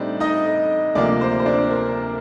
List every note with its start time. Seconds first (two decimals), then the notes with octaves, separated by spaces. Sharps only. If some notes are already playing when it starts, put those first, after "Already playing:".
Already playing: A2 G3 C4 D4 D#4
0.20 D#4 D#5
0.95 D2 C3 F3 A#3 D4 D5
1.21 C5
1.39 C5
1.45 D4 D5
1.71 A#4